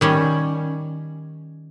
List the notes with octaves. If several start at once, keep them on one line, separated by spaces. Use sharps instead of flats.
D#3 G3 C#4